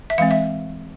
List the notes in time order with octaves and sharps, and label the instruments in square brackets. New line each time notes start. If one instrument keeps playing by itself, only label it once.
[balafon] E5
E3 G#3 C4 F5
E5